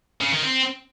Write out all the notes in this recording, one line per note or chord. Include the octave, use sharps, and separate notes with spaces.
C#3
D#3
C4